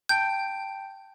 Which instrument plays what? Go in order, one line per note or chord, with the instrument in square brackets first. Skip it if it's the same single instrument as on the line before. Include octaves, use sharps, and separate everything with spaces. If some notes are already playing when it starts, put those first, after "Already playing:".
[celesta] G5 A5 D7 [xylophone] G6